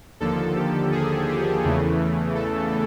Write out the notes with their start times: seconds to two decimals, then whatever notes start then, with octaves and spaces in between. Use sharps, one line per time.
0.20 D#2 D3 F3 A#3 A4
0.56 G4
0.92 G#4
1.29 G4
1.64 E2 C#3 E3 A3
2.35 A4